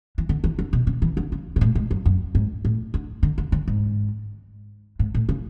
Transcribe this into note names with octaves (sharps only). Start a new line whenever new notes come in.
E3
D3
E3
D3
B2
C#3
E3
D3
C#3
B2
A2
G#2
F#2
F#2
G#2
A2
D3
D3
D3
D3
G#2
G#2
A2
C#3